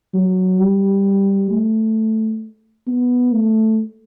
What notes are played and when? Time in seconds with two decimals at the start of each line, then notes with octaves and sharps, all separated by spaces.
0.14 F#3
0.60 G3
1.51 A3
2.87 B3
3.33 A3